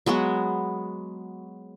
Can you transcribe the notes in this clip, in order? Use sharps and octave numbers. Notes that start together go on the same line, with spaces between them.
F#3 G#3 B3 F#4